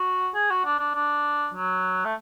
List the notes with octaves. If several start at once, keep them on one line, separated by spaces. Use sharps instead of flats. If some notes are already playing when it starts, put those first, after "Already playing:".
Already playing: F#4
G#4
F#4
D4
D4
D4
F#3
A3